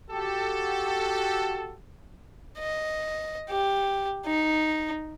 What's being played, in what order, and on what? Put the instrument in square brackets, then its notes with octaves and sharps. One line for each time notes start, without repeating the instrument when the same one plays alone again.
[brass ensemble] F#4 G4 A4
[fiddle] D#5
G4
D#4